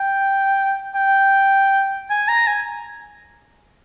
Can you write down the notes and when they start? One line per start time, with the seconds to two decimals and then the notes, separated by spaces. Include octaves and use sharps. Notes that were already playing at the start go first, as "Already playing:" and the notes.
Already playing: G5
0.95 G5
2.10 G#5
2.28 A#5
2.47 G#5